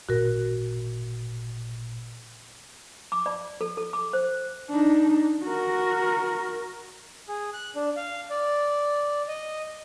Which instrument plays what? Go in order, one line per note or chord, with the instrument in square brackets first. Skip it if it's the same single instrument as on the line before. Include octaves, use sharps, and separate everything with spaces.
[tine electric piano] G#1 A#2 [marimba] F#4 A#4
[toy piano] D6
D5
A4
A4
D6
C5
[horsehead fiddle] D4 D#4
F#4 A#4
[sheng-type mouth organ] G#4
F#6
D4
F5
D5
D#5